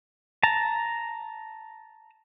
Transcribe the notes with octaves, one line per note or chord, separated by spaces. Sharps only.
A5 A#5